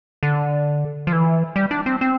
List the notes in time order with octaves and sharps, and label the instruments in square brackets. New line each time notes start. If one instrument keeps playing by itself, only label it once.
[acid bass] D3
F3
E3
G3
D4
C4
C4